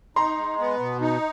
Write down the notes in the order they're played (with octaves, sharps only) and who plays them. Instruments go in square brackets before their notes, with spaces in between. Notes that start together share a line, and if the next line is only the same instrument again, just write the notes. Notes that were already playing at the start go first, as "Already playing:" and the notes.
[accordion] D#4 [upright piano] A#5 C6
[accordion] G#3
B3
B2
D#4